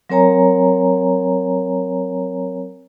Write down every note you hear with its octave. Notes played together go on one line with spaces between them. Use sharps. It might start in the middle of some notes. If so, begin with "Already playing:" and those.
F#3 C4 A#4 C#5 G#5 A#5